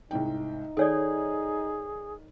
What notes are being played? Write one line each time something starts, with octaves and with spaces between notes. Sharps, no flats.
C2 G#2 D#4 G5
D#3 G#4 A4 C#5 D5